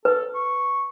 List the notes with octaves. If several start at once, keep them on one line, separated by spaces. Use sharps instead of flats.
A4 B4
C#6